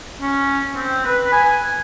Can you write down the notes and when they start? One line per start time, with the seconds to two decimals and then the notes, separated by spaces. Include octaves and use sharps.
0.21 C#4
0.74 C4
1.04 B4
1.32 G#5